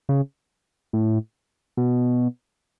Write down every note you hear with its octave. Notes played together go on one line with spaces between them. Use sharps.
C#3
A2
B2